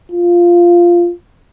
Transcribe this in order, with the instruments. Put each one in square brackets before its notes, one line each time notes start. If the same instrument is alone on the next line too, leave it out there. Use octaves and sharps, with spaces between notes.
[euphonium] F4